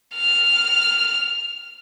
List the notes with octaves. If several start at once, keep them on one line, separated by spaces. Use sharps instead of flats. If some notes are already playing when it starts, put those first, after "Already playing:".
F6